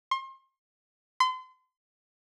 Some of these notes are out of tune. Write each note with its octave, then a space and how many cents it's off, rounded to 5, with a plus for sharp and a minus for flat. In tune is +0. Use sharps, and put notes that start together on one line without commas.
C6 +35
C6 -35